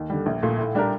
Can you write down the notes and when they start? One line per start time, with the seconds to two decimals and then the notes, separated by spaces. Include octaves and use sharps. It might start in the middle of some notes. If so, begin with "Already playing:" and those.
Already playing: D#2
0.10 D3 G3
0.26 A#1
0.43 A#2 A3
0.58 A2
0.75 G3 D4 G4 A#4